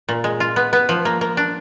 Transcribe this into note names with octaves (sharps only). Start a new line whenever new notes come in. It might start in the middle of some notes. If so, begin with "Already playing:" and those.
A#2
G#3
F4
B3
B3
F3
A#3
A#3
D4